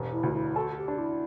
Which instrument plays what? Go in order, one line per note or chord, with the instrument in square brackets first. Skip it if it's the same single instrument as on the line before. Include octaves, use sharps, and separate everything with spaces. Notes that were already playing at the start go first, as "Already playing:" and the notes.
Already playing: [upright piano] E1 G2
[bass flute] E4
[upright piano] D2
[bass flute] E4
[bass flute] F#4 [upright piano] A4
[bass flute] F#4
G4
[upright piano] D4
[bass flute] E4